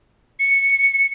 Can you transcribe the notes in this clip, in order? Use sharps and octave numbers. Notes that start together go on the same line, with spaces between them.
C#7